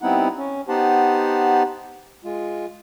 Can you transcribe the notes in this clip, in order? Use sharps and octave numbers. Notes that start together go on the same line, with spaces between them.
G3 B3 C4 D#4 E4 F#5
C#4
B3 D#4 G4 C5 F#5 A5
G#3 F4